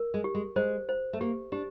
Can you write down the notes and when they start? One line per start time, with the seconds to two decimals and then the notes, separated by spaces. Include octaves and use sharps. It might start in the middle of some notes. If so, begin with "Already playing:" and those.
Already playing: A#4
0.14 G#3
0.24 G4
0.35 G#3
0.56 G#3 C5
0.89 C5
1.13 A3
1.21 A#3 G4
1.52 D4 G4